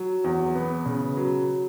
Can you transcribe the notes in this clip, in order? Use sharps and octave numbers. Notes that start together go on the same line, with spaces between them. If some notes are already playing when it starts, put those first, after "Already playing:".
Already playing: F#3
E2
B3
C#3
F#3